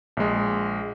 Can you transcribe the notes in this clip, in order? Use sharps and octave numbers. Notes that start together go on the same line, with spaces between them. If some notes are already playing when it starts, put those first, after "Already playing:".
A#1 G#3